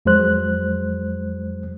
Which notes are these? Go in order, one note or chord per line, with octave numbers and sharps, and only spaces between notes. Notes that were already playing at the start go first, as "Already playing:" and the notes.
F2 F#3 G#3 C5 F#6